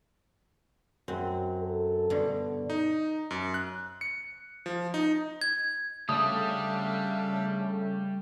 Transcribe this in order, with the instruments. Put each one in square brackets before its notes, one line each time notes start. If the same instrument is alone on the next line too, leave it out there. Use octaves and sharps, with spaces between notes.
[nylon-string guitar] F#2 [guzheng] C4
[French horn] A4
[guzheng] G2 B2 D3
[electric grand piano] D#4
F#2
F#6
C#7
F3
D#4
[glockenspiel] G#6
[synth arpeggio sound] C#3 A3 [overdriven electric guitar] G3 [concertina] D4 E5 F5 [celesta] D#6